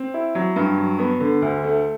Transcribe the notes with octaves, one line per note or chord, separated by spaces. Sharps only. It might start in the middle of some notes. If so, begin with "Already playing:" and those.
Already playing: C4
E4
F#3
G2
F#3
B3
D3
D2
A3